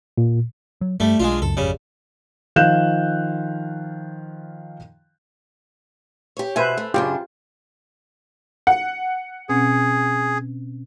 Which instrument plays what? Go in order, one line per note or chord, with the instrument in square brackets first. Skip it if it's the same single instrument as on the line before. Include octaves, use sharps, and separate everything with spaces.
[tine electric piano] A#2
[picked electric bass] F#3
[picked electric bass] G2 [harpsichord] G3 A3
[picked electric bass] B1 [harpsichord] G#3 D4 F4
[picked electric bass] C#2 F#2 [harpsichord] A4
[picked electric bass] G#1 F2 [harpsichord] C#3 G3
[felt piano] D#3 F3 F5 F#6 G6 E7
[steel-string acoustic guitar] G4 C#5
[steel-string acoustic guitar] B2 E5 [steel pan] B4 C5 G#5
[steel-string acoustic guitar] A3
[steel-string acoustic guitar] F#2 C#3 D4 [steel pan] F4 G4 G5
[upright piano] F#5
[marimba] B2 C4 C#4 [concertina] G#4